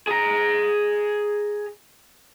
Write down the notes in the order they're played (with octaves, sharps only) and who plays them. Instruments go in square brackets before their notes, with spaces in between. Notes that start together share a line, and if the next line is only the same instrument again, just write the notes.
[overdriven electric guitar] G#4 A#5